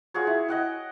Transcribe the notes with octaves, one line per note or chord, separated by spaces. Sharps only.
F4 F#4 G#4 C#5
E4
D#5 F#5 G5